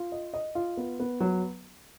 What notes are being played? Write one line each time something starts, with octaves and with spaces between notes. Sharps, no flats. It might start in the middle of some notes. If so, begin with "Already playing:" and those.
Already playing: F4
D#5
D#5
F4
B3
B3
F#3